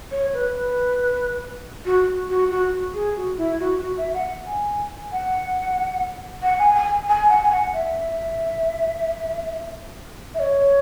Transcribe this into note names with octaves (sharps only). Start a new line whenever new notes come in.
C#5
B4
F#4
F#4
F#4
G#4
F#4
E4
F#4
F#4
E5
F#5
G#5
F#5
F#5
G#5
G#5
G#5
F#5
G#5
F#5
E5
E5
C#5